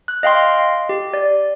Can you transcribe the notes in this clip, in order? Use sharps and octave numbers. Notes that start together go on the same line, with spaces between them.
F#6
D#5 F5 G5 C6
G4
D5